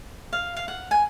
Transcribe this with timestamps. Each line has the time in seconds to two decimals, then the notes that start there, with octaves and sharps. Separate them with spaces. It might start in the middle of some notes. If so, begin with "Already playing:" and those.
0.33 F5
0.56 F5
0.68 F#5
0.91 G#5